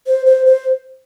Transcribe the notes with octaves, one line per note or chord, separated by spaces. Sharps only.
C5
C5
C5